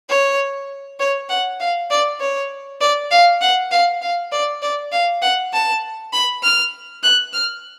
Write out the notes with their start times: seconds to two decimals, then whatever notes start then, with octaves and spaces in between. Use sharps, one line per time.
0.09 C#5
1.00 C#5
1.29 F#5
1.60 F5
1.90 D5
2.21 C#5
2.81 D5
3.11 F5
3.41 F#5
3.71 F5
4.01 F5
4.32 D5
4.62 D5
4.92 F5
5.22 F#5
5.53 A5
6.13 B5
6.43 F6
7.03 F#6
7.33 F6